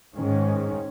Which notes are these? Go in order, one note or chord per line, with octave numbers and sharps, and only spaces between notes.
G#2 D#3 G#3 C#4